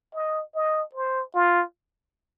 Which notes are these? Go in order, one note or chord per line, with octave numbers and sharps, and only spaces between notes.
D#5
D#5
C5
F4